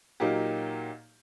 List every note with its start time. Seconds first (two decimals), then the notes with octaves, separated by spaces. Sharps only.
0.20 A#2 F#3 A#3 D#4 G4